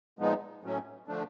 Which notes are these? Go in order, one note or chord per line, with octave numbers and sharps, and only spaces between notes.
A#2 F3 G#3 B3 D#4
A2 F#3 A3 C#4
D3 F3 A3 D4